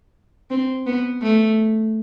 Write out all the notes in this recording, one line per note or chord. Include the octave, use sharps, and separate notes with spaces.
C4
B3
A3